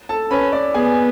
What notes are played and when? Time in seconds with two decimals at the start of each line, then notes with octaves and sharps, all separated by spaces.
0.09 A4 A5
0.31 C#4 B4 B5
0.52 D5 D6
0.74 B3 G#4 G#5